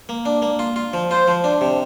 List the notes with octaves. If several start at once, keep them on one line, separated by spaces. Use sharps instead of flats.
A#3
D4
A#3
F4
F4
F3
F4 C5
F3
D4
C3